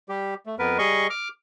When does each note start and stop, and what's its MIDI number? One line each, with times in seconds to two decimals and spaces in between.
0.09 0.34 55
0.09 0.34 67
0.46 0.55 57
0.59 0.78 41
0.59 0.78 59
0.59 0.78 70
0.59 0.78 71
0.78 1.07 55
0.78 1.07 68
0.78 1.07 75
0.78 1.07 85
1.10 1.28 86
1.10 1.28 89